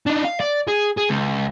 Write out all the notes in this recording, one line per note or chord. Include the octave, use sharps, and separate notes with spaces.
D4 D#4
F5
D5
G#4
G#4
C#2